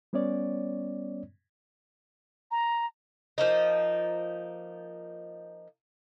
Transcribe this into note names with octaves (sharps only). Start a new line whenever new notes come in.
G3 B3 C#4 C#5 D5
A#5
F3 A#3 D#4